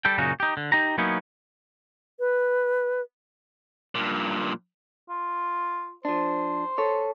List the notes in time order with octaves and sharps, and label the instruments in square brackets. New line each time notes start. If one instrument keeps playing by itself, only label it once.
[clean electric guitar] G3 A4 G5
F#2 A#2 C#3 C#4 D#4 F#4
D#4 G4
D3
D#4 G4 A#5
F#3 A#3 B3 C#4 D#4 E4
[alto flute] B4
[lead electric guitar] G2 A#2
[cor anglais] F4
[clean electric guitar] F3 D4 [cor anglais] C5
[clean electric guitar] A4 C#5